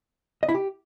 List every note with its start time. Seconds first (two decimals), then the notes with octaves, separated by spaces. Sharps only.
0.43 D#5
0.49 E4
0.54 G4